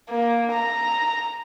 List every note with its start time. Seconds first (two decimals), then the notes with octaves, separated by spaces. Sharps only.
0.10 A#3
0.52 A#5